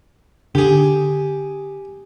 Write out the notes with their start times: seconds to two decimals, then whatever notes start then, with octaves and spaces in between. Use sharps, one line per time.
0.55 D3 G4 G#4